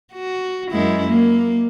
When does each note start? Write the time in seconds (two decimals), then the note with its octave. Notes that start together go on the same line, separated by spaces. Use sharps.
0.12 F#4
0.71 F#2 G#3 E4
1.08 A#3